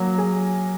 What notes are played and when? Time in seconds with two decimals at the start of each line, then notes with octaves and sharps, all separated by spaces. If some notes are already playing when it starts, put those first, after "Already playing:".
Already playing: F#3 A#3
0.18 G#4